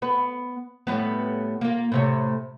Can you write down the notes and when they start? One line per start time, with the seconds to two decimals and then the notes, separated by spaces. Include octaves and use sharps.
0.02 B3 B4
0.87 A2 G3 B3
1.61 A#3 F4
1.92 A2 C3 C#5